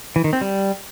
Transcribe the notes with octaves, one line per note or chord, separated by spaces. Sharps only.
E3
D#3
C4
G3